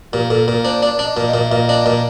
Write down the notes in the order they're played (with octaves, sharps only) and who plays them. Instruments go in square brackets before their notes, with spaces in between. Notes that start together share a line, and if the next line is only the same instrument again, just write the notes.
[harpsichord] A#2 [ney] G4
[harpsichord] A#2 [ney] A4
[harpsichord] A#2 [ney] A#4
[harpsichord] D4 [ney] C5
[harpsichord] D4 [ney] D5
[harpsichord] D4
[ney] D#5
[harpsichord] A#2
[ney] D#5
[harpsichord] A#2
[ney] F5
[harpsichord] A#2 [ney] D#5
[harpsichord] D4
A#2